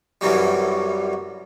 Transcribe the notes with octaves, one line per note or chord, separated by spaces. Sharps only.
C2 F#2 E3 F#3 G3